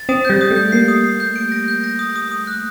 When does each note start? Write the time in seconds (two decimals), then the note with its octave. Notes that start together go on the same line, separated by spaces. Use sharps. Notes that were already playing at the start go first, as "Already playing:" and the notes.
Already playing: A6
0.09 C4 D#6
0.25 G3 G6
0.41 D#6
0.51 A3
0.57 G6
0.72 A#3 C7
0.88 D#6
1.04 C7
1.20 G6
1.36 D7
1.52 A#6
1.68 G6
1.84 A#6
1.99 D#6
2.16 D#6
2.32 D#6
2.47 F#6